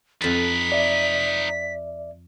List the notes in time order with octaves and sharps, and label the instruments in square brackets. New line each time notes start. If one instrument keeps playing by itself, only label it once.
[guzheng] F2 A5 [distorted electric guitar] D#4 B4 [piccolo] B6
[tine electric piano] D5 E5